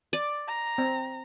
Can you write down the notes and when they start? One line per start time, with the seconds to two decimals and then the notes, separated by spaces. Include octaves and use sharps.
0.13 D5
0.48 A#5
0.78 C4